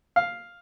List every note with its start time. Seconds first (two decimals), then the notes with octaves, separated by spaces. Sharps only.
0.16 F5